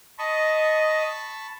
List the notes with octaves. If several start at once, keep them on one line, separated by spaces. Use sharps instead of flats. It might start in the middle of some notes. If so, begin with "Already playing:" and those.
D#5 A5 B5 C#6